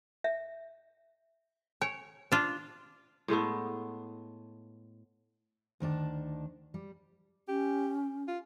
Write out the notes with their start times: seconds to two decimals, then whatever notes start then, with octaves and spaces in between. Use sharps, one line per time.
0.24 E5
1.81 C#5 G#5
2.32 D4 F4
3.28 A2 G#3 A3 B3
5.80 D2 D#3 D4 A5
6.74 G3
7.49 C#4 G4
8.28 F4